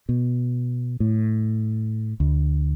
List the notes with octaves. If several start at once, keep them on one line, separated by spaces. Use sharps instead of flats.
B2
A2
D2